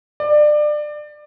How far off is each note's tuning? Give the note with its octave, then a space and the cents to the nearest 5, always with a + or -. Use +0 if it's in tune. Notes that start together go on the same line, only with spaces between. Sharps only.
D5 +25